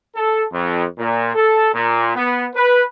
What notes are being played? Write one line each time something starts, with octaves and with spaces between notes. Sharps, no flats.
A4
F2
A#2
A4
A#2
B3
B4